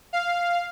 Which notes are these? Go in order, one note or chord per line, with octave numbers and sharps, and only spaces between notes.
F5